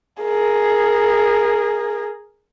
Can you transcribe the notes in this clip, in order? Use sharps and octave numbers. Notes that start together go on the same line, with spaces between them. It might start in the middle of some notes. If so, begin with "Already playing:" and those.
G#4 A#4